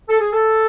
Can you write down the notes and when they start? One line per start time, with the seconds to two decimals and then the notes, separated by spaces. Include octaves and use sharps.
0.09 A4
0.21 G#4
0.33 A4